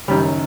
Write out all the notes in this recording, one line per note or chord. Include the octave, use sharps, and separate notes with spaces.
F#1 F#2 D#3 G3 G4